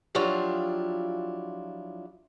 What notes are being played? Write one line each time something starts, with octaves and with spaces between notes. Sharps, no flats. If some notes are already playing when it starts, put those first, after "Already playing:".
F3 F#3 D4 E4 F4 G4